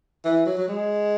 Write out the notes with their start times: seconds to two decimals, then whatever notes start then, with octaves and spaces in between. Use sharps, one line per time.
0.24 E3
0.46 F#3
0.57 F#3
0.68 G#3